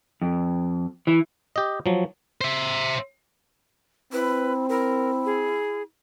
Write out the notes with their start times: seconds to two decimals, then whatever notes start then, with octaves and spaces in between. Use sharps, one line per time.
0.22 F2
1.07 E3
1.56 G4 D#5
1.86 F3 F#3
2.41 C5 E5
4.13 C4 E4 B4
4.69 E4 A#4
5.26 G#4